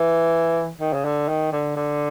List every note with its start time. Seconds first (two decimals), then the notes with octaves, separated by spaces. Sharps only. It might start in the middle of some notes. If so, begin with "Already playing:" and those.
Already playing: E3
0.80 D#3
0.93 C#3
1.05 D3
1.28 D#3
1.52 D3
1.77 D3